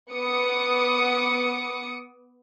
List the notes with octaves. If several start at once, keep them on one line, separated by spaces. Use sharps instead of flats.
B3 D6 D#6 C#7